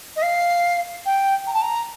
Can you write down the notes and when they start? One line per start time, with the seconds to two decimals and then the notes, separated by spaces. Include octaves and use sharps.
0.16 D#5
0.22 F5
1.05 G5
1.47 A#5
1.54 A5
1.62 A#5